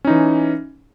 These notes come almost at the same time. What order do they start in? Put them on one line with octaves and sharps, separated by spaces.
C#4 D#4 E3